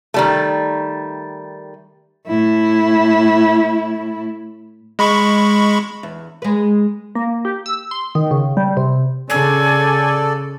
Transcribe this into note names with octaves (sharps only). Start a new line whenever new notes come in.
D#3 G3 A3
A2 E4
G#3 B5 C#6
E2
G#3 B4
A#3
G4
E6
C6
D#3
C#3
G3
C3
C#3 A4 D5 G#5